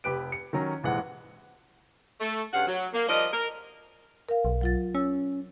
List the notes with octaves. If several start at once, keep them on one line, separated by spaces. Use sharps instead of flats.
F1 G4 B4 D7
C#7
D#3 F#3 C#4 A#5
F1 A#1 E3 G#3 F#5
A3
G2 C#3 F5 F#5
F#3
A#3
F3 G3 A#4 D#5
A#4
A#4 F5
B1
F#3 F4 A6
C#4 E6